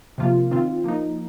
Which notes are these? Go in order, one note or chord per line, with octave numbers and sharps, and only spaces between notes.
C3 F3 A#3 F4
D#3 C4 F4
F3 A#3 D#4